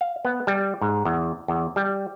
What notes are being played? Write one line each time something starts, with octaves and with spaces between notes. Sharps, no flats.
F5
B3
G3
G#2
E2
E2
G3